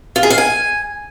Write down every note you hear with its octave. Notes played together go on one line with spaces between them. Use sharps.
F4
G#4
F5
G#5